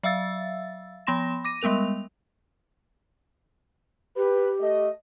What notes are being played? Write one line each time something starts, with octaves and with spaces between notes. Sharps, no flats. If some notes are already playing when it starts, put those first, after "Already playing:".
F#3 E5 F5 E6 A6
F3 B3 B5 C6 A#6 E7
D6 A#6 D#7
G3 G#3 B3 A#4 F7
G4 B4
A3 D#5